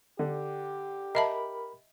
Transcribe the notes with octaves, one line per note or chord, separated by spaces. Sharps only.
D3 G4
A#4 D#5 E5 A5 B5